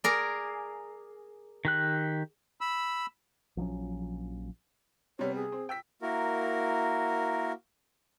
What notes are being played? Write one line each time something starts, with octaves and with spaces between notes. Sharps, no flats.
G#4 A#4 D5
D#3 G4 F#6
B5 E6
A#1 F3 F#3 C#4
C3 G3 B3 C#5
G#4
C4
G5 E6 B6
A#3 E4 F#4 A#4